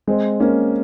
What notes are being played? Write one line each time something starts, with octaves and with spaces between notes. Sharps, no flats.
G#3 C4
A#3 C#4